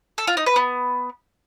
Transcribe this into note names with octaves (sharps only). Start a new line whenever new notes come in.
A4
F4
D#4
B4
B3